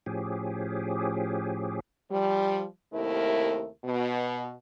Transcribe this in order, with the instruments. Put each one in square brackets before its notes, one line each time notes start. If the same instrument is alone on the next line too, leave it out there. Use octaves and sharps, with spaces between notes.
[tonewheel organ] A2 F3 C#4 G4 G#4
[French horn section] F3 G3
D#2 C3 A3 E4 A#4
B2